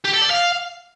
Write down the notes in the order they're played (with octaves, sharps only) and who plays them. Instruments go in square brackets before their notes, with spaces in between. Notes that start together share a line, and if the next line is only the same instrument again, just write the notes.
[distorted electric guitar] G4
A4
D5
F5